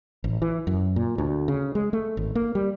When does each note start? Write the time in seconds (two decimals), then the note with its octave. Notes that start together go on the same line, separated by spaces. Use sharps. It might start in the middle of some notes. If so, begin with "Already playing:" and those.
0.24 A1
0.42 E3
0.67 F#2
0.96 A#2
1.18 D2
1.48 C#3
1.75 G#3
1.93 A3
2.17 G#1
2.35 A#3
2.55 G3